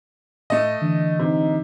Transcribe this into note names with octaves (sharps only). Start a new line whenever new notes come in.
A2 A3 D#5
D3 E3 D4
C3 D#4